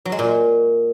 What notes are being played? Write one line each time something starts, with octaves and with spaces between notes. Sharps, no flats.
F#3
G#3
A#2